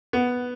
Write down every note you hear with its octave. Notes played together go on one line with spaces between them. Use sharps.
B3